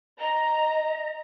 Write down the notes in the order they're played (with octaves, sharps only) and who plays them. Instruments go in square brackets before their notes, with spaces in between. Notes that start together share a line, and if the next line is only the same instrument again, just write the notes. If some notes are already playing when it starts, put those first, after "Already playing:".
[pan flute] D#5 [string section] A#5